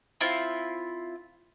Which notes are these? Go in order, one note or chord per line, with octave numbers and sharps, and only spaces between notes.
C4 E4 F4